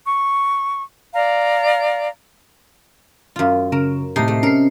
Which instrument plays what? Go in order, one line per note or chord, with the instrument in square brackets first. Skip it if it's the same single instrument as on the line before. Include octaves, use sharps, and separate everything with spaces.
[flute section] C#6
D5 F5 A#5
[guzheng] F#2 F4
[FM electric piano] C#3 [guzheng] A#4
[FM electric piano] A2 A5 C7 [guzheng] C3 D#4 D#5
[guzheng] A3
[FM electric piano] C#4 C7 [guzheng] A#4